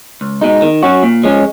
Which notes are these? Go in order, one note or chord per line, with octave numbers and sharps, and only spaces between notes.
C#2
B2 G#3 D#4
D#3
F#3 C#4 F#4
A#2
F3 G#3 C#4